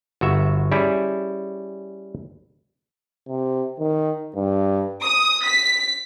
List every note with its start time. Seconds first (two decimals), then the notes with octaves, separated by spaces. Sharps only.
0.21 G1 F#4 E5
0.72 G3 C#4 E4 G#4
3.28 C3
3.79 D#3
4.36 G2
5.04 D#6
5.45 B6